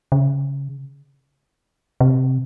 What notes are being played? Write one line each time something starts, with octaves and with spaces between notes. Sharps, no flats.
C#3
C3